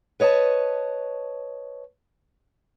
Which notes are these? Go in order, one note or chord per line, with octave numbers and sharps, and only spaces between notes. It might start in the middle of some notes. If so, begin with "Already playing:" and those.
B4 C#5 D#5 E5 A5